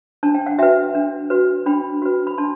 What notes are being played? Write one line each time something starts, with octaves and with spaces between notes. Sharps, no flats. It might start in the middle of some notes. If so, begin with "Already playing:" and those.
D4 A5
G5
F#5
F#4 B4 E5 G5
D4
F#4 B4
D4 G5 B5
F#4 B4
B5
D4 A5 C6